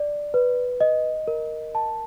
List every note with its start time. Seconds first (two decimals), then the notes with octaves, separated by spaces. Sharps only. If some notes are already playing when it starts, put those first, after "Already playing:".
Already playing: D5
0.34 B4
0.81 D#5
1.27 A#4
1.75 A5